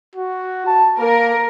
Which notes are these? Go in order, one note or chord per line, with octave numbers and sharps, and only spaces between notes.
F#4
A5
A#3 A#4